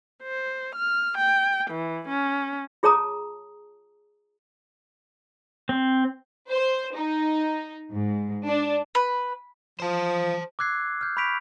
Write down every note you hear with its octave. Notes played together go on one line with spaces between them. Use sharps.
C5
F6
G5
E3
C#4
F4 G#4 C#5 A5 A#5 D#6
C4
C5
D#4
G#2
D4
B4
F3 C5 A5
D6 E6 F#6 G#6 C7
F6 G6
B5 C#6 G6 B6 D7 F7